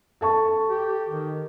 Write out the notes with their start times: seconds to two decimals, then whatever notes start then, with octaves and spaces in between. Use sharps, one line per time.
0.21 A4 A5 C#6
0.68 G4
1.08 D#3